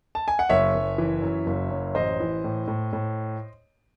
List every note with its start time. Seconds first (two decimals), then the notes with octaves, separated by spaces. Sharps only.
0.15 A5
0.28 G#5
0.39 F#5
0.49 F#1 C#5 E5
0.74 F#1
0.98 E3
1.22 F#2
1.46 F#1
1.71 F#2
1.95 A1 C5 D#5
2.20 E3
2.44 A2
2.68 A2
2.93 A2